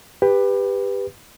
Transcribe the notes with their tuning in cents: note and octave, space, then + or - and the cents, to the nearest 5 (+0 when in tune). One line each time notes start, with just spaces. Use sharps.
G4 +20 B4 +0